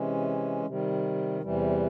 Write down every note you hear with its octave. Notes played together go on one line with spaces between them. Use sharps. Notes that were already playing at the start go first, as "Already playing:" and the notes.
Already playing: C3 E3 G#3 C#4
C3 D#3 G3
E2 C3 E3 G3